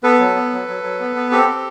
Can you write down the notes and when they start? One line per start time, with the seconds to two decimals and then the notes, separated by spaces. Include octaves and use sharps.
0.03 B3 A4 B4
0.19 F#3
0.35 B3
0.52 F#3
0.68 F#3
0.83 F#3
1.00 B3
1.16 B3
1.31 C4 G4 A4
1.48 C4